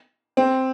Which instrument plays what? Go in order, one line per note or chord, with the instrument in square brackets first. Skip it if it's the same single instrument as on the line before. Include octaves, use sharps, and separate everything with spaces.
[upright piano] C4